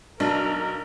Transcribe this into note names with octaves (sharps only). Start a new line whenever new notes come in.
B1 D4 A#4